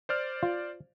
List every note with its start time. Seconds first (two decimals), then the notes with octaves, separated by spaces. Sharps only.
0.09 C5 D5 F6
0.43 F4